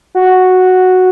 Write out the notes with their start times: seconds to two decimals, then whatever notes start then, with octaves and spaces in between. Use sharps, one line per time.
0.15 F#4